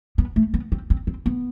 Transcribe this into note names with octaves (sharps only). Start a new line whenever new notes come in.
B3
A3
B3
C4
C4
C4
B3